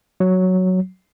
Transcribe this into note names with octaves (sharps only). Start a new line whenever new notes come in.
F#3